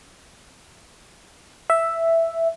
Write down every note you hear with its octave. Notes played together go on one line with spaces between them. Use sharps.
E5